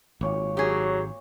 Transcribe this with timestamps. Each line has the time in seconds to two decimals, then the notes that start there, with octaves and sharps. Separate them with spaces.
0.21 G#1 A#2 C#5 D6
0.57 F#3 G4 G#4